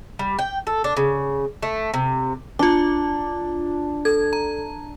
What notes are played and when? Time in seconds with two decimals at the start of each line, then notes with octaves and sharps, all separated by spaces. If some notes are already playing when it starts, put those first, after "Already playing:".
0.19 G3
0.39 G5
0.67 A4
0.84 D4
0.97 C#3
1.63 A3
1.94 C3
2.59 D4 F4 D6
4.05 A4 G#6
4.33 A#5